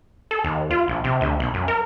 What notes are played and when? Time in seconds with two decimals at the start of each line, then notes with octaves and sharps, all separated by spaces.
0.31 A4
0.44 D#2
0.71 F4
0.88 A#1
1.04 C3
1.21 D2
1.40 B1
1.54 F#2
1.68 A#4